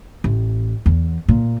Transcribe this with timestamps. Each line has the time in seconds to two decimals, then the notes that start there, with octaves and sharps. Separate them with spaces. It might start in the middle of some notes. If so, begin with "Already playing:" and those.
0.24 A1
0.86 E2
1.29 A#2